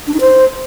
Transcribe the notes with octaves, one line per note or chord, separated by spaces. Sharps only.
D4
D#4
C5